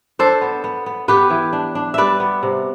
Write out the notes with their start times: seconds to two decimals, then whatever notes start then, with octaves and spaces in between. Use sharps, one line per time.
0.19 D4 A4 C5
0.41 B3
0.64 B3
0.86 B3
1.08 B3 G4 B4
1.30 E3
1.53 D4
1.75 D4
1.94 G3 B4 D5 E5
2.20 B3
2.43 C3